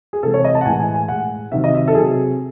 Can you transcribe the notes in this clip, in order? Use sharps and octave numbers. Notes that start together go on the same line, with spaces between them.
G#4
C3 E3 G#3 A4
C#5
D#5
A5
F#5
A2 E3 G#3 G#5
G#5
G#5
A2 G#3 F#5
C3 D#3 F#3 E5
D#5
E5
A4
C3 F#3 G#4